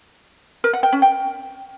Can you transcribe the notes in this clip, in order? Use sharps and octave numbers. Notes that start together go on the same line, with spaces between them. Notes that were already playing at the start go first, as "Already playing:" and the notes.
A#4
F#5
G5
C#4
G5